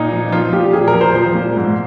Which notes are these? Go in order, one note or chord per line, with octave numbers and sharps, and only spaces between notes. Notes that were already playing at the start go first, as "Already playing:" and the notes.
Already playing: A#2 D#4
F3
F3 F4
A#2 G4
A#2 G#4
A#4
F3
C5
F3 C5
A#2
G#2